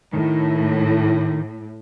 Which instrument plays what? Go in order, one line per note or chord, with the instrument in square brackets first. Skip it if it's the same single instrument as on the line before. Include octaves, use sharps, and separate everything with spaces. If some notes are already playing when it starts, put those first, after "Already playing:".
[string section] A2 [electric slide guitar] D#3